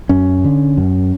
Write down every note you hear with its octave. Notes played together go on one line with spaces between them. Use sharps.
F#2 C#4
D3
F#2